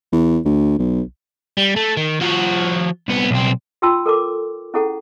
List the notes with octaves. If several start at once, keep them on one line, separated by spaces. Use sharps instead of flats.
E2
D2
B1
G3
A3
D#3
F3 F#4
C2 B3
B1 C4
D#4 F4 G5 A5 C6 E6
A4 A#4 A5 D6
C#4 E4 G#4 A4 F#5 A5